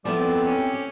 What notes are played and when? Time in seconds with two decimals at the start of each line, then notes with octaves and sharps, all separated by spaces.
0.05 F3 G3 B3 E4 A4 D5
0.17 C4
0.46 C#4
0.58 G4
0.74 G4